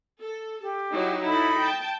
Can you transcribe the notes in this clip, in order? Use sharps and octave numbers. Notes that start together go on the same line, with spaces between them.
A4
G4
F#3 D#4 E4
D#4 E4 A4 B5
G5 A5